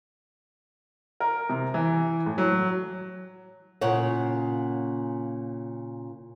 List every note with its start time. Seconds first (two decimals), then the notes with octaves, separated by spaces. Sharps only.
1.20 A#4
1.50 C3
1.74 E3
2.26 A2
2.38 F#3
3.81 A#2 C#3 C#5 F#5